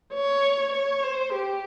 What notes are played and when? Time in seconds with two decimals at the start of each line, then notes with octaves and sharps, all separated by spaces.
0.14 C#5
0.73 C#5
1.03 C5
1.33 G4